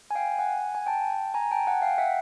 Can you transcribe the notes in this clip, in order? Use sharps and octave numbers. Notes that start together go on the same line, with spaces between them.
G#5
F5 G5
F#5 G#5
G#5
G5 A5
G#5 A#5
G5 A5
F#5 G#5
F5 G5
E5 F#5